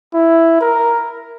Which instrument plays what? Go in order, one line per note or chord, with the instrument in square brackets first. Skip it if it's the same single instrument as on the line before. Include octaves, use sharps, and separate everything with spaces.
[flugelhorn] E4
A#4